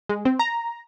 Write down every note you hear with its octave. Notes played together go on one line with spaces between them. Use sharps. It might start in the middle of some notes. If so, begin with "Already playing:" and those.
G#3
C4
A#5